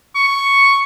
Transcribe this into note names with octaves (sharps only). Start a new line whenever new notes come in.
C#6